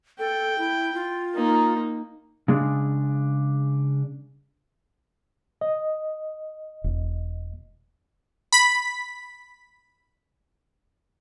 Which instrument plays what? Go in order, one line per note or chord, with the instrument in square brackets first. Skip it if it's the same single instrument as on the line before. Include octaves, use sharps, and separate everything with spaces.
[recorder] A4 [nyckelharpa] G5
[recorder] E4
F4
[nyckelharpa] A#3 D#4
[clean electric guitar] C#3 G#3 D4
[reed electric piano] D#5
[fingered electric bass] E1
[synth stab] B5 B6